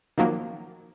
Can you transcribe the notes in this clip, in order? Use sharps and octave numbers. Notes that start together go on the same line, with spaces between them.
D#3 F3 F#3 A#3